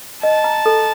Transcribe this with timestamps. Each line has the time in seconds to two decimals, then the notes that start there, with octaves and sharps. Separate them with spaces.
0.23 D#5 A5
0.44 A#5
0.66 A4